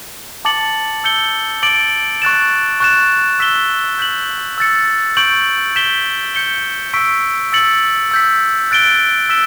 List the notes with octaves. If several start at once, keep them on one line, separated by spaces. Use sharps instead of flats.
A5 D6 A6 C#7 F#7
E6 G6 C#7 G7
D6 A6 D7 F#7
C#6 F#6 A6 E7
C#6 F#6 A6 E7
E6 B6 E7 G7
G6 B6 F#7
E6 A6 C#7
C#6 G6 D7 F#7
G6 B6 E7 G7
G6 C#7 G7
C#6 E6 B6 D7
E6 A6 C#7 F#7
E6 G6 B6
F#6 A6 D7 G7
E6 B6 E7 G7